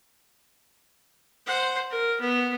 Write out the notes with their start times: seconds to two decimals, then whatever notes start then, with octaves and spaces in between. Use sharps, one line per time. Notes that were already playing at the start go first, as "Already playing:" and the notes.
1.47 C5 F#5
1.90 A#4
2.20 B3